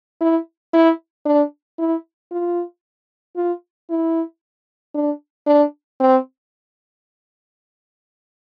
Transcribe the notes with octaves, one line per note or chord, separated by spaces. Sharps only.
E4
E4
D4
E4
F4
F4
E4
D4
D4
C4